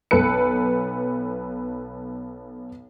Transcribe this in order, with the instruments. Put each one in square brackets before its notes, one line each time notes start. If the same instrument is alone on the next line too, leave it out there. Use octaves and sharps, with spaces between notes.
[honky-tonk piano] B1 A4 B4 C#7